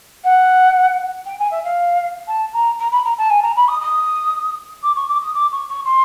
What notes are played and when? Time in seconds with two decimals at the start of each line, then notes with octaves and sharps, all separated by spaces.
0.24 F#5
1.25 G5
1.39 G#5
1.51 E5
1.63 F5
2.27 A5
2.53 A#5
2.79 A#5
2.91 B5
3.04 A#5
3.17 A5
3.30 G#5
3.42 A#5
3.56 B5
3.68 D#6
3.81 D#6
4.82 D6
4.95 C#6
5.08 D6
5.21 D#6
5.34 D6
5.51 C#6
5.68 C#6
5.85 C6